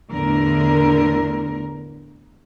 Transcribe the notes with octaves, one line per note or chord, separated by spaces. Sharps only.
E2 A2 D3 A#4